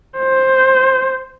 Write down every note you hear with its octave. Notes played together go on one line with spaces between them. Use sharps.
C5